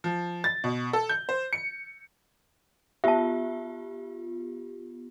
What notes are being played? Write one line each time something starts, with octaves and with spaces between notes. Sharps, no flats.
F3
A6
B2
A4
G6
C5
C#7
B3 F4 G4 E5 A5